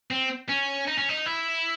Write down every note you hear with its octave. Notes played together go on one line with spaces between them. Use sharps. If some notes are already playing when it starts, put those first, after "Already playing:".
C4
C#4
D#4
C#4
D#4
E4